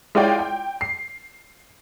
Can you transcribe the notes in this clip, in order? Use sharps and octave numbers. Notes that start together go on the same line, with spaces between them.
G#3 E4 F4 C#5 D5 G5
G5
C7